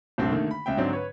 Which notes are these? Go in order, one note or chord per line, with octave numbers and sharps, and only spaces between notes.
D#1 C2 G2 A3 C4
D3 D#3 A3 A#3
B5
C#2 E5 G5
G#2 D3 F#3 C4 D4
B4 C#5